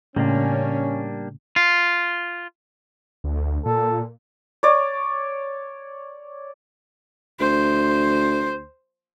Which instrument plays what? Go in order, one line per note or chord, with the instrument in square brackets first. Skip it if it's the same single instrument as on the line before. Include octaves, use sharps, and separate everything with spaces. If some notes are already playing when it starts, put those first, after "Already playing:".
[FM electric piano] A2 C#3 [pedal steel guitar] G3 A#3 D4 [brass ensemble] C#4
[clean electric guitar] F4
[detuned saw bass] D2
[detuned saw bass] A#2 [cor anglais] A4
[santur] C#5 D5
[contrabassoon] D2 [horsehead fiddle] C5